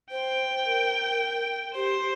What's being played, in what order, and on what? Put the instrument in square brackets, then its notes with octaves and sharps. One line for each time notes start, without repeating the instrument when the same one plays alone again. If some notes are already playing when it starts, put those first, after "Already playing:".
[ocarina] C5 [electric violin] G5
[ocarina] A#4
[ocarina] G4 [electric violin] C5